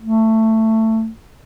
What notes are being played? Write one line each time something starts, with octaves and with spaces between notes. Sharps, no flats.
A3